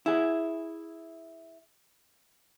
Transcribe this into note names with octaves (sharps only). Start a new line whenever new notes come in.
E4 G#4